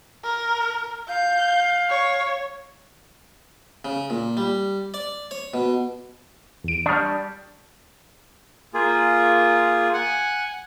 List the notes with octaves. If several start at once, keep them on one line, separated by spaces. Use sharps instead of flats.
A#4
F5 G6
C#5
C#3
A#2
G3
D5
C#5
B2
E2 D7
G3 D4 C#6 D#6 F6
A#3 F4 G#4
F#5 G#5